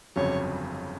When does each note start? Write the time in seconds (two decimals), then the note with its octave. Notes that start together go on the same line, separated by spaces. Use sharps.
0.16 G1 F2 C#3 F#3 C#5